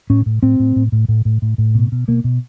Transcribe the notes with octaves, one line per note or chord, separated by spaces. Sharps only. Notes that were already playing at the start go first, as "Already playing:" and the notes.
A2 C#4
A2
A2 C4
A2
A2
A2
A2
A2
A2
A2
B2
B2
B2 A#3
B2